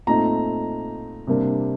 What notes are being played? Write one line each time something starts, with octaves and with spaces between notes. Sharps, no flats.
A#2 A3 C4 D#4 A#5
C3 G3 A#3 D4